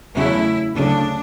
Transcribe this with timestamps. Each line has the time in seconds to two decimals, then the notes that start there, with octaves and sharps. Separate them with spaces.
0.14 E2 C#3 F#3 A3 E4
0.75 D2 C#3 F#3 A3 D4